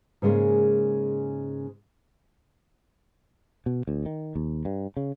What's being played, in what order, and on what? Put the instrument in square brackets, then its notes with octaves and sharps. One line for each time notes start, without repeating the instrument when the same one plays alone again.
[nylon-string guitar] G#2 C#3 G#3 A#3
[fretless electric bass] B2
D2
D#3
D#2
G2
C#3